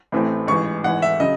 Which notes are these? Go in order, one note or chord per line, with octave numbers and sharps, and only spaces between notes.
A1 A2 E3 A3 C4
A1 G#2 E3 C#6
G#1 G#2 E3 F#5
E5
C#3 F#3 D#5